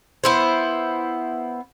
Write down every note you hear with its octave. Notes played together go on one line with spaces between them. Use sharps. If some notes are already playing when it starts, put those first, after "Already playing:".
B3 E4 C5